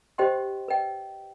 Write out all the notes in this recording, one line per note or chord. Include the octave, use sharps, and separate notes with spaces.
G4 C5 D#5 G5 C6
B4 D#5 G5